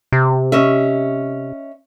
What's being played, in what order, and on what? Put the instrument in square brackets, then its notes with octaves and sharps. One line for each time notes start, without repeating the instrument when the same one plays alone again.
[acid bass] C3
[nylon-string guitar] C#4 D#5 E5